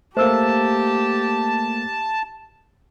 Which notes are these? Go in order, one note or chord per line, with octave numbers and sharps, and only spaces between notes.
A3 A#3 G4 C5 A5 E6